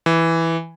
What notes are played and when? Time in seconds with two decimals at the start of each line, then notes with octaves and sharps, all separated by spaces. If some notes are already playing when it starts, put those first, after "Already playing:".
0.06 E3